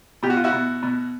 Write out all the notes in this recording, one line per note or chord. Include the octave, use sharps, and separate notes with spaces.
B2 G4
F#4
F4
E4 F#4
B2
B2